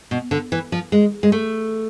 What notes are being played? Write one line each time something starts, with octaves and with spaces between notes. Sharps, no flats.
B2
D3
E3
F3
G#3
G#3
A3